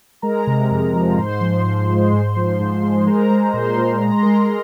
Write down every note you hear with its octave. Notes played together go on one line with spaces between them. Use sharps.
G#3 A#4 A#5
C3
F2
F3
G#2 C5 C6
F3
G#2
G#3
G#2
F3
G#2
G#3
G#3 A#4 A#5
G#3
A#2 C5 C6
A#2
G#3 A#5
C6
G#3 A#4 A#5